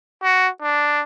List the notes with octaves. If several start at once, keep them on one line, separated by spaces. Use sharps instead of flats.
F#4
D4